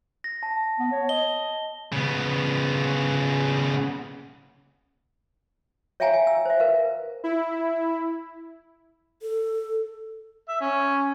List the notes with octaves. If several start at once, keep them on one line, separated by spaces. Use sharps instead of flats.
A#6
A5
B3
C#5
D#5 G7
C#3 B3
C#5 E5 F5 G5 G#5 A#5
G#5
E6
C5 E5
A#4 B4 F5
E4
A4
E5
C#4